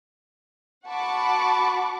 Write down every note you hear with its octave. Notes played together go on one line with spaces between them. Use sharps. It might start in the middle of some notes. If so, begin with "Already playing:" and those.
F#4 F#5 A5 B5 C#6 D6